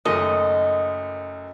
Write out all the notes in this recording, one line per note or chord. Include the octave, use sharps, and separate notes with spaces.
F#1 F#2 D#3 A3 D#5